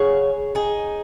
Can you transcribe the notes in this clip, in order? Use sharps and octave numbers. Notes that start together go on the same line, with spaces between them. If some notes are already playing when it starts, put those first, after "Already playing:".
Already playing: C#3 F#3 G#4 C#5
D#4 G#4